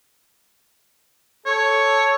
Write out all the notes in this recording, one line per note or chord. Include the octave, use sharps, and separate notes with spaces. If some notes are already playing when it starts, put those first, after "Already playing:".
A4 C#5